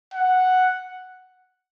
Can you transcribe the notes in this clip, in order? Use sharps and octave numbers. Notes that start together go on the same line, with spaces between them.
F#5